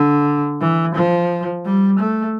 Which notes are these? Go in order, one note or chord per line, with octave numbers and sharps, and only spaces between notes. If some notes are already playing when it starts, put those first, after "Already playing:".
Already playing: D3
E3
F3
G3
A3